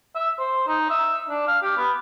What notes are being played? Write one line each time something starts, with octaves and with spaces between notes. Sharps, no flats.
E5
C5
D#4
E5
D4
F5
G4
B3